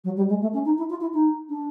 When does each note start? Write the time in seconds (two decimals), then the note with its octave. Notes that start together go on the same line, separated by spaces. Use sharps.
0.04 F#3
0.16 G3
0.29 G#3
0.41 A3
0.53 C#4
0.65 D#4
0.77 E4
0.89 F4
1.00 E4
1.13 D#4
1.49 D4